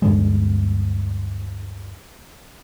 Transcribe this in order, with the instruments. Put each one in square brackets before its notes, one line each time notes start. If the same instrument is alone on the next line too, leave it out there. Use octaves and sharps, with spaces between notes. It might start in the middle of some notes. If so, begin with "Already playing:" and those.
[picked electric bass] D2 G2 D3 G#3